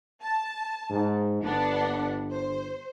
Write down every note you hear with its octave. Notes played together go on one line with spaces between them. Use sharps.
A5
G#2
G1 B3 D4 F#5
C5